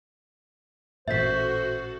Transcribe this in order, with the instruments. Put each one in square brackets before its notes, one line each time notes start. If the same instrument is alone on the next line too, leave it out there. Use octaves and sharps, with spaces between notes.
[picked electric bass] A1 A#2 [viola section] F#4 A4 [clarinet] C5 [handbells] E5 B6